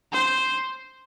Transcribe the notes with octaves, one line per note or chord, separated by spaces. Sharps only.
C5